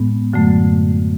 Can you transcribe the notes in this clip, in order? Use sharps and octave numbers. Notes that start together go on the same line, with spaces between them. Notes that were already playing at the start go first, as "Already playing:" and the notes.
Already playing: A2 G#3 B3
F#2 D3 F#3 A3